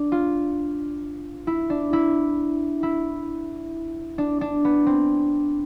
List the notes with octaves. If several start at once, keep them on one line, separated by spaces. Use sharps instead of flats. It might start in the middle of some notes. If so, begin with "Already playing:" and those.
Already playing: D4
F4
E4
D4
E4
E4
D4
D4
B3
C4